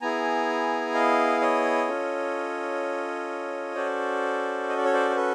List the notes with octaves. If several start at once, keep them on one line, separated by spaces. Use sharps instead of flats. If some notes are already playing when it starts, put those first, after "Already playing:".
B3 E4 G#4 G#5 A#5
D#5 F5
C#5 D#5
C#4 F4 A4
C#4 F#4 A4 C5 D5
D#5
D5
C#5
C5 D5
C5
A4 B4